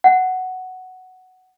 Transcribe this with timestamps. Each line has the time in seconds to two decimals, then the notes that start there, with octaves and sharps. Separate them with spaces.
0.04 F#5